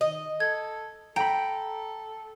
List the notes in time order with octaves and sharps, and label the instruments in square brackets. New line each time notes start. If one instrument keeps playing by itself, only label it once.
[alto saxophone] D#3 [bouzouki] D#5
[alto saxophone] A4 [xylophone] G#6
[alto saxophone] A4 [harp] G5 B5 [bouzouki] A#5